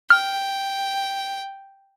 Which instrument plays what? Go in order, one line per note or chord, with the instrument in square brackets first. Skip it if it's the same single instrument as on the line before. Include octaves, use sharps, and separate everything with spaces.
[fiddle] G5 [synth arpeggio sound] F6